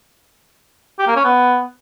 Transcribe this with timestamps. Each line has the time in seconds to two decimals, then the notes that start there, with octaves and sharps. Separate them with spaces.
0.99 G4
1.07 A#3
1.16 C#4
1.24 B3